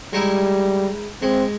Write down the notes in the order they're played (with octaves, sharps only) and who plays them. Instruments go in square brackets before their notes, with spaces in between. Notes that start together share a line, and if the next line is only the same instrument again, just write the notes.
[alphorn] G3 [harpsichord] G#3 D#4 E4
[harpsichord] G#3 [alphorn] C4